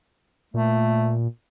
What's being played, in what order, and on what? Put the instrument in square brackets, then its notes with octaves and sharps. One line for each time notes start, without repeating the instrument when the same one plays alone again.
[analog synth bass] A#2 [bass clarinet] A3